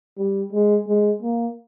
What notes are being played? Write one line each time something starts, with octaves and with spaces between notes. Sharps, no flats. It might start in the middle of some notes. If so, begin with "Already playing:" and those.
G3
G#3
G#3
A#3